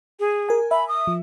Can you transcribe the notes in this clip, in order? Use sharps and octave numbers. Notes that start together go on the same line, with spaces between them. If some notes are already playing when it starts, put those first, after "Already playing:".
G#4
A#4 G#5
E5 B5
D#6
F3